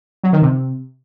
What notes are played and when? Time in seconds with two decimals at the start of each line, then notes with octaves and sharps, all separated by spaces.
0.24 F#3
0.33 D#3
0.42 C3